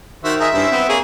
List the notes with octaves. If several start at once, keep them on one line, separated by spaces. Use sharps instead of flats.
D#3 F#4 C5 E5
G#4 A#4 D#5 E5
G2 C4 C#4 E4
B3 C4
A#3 G#4 C#5